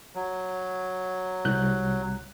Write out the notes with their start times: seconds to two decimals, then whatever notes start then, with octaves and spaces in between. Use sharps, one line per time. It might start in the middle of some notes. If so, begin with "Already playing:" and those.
0.15 F#3
1.45 C2 F#6 G6